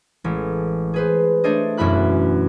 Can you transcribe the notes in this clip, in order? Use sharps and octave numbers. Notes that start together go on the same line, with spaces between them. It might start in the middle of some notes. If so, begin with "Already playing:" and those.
A1 G#3
G#4 B4 C5
A3 D4 C5 C#5 D#5
E1 F#2 B2 E4 B5 F#6